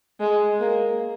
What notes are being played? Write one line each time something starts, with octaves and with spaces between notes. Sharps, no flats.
G#3
A#3